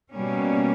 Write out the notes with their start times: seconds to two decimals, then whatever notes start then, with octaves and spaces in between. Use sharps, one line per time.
0.14 B2 G3 A#3 C#4